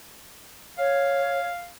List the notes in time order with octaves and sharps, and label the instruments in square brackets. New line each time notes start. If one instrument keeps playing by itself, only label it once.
[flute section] C#5 [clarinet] F5